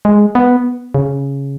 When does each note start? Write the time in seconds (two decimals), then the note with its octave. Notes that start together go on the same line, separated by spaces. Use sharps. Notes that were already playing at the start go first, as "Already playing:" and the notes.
0.05 G#3
0.35 B3
0.94 C#3